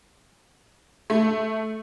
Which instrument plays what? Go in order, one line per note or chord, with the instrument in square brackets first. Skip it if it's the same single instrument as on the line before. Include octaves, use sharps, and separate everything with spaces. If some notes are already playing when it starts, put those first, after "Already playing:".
[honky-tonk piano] A3